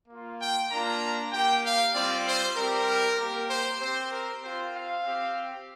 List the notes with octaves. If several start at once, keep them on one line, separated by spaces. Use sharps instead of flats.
A#3 F4
G5
A#3 D4 F4 A#5
A#3 G4 G5
F5
G3 C4 F4 D5
C5
G3 C4 G4 A#4
A#3 G4
C5
C4 G4 C5
A#4
C4 F4 C5
F5
C4 G4